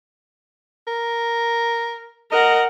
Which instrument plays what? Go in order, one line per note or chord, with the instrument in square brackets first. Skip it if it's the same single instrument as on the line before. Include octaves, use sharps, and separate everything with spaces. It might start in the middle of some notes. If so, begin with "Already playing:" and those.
[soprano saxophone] A#4
[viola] A#4 F#5 [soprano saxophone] D#5